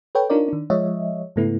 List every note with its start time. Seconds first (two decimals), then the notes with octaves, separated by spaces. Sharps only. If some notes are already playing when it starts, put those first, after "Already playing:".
0.15 A4 B4 C#5 G5
0.30 D4 D#4 F4 A#4 C#5 D5
0.48 D#3 D4
0.70 F3 G#3 C#5 D#5 E5
1.36 G#2 C#3 A3 B3 E4